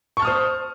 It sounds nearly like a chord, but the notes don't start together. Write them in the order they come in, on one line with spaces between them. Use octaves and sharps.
C#6 A5 F6 D#6 C5